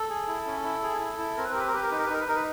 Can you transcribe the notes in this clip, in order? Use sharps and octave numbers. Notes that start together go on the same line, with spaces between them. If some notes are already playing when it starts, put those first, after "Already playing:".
Already playing: A4
G#4
E4
C#4
E4
G#4
E4
E4
C4 A#4
B4
A#4
G4 B4
A#4
G4 B4
A#4
D#4 B4
A#4
B4
D#4 A#4
B4
D#4 A#4
B4